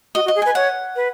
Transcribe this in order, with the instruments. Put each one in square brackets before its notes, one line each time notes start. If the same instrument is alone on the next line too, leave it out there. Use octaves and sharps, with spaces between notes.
[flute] F#4 [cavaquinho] D#5
[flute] F#4
[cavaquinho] D#5
[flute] G#4
[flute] B4 [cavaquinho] G#5
[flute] C#5 [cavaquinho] F#5
[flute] B4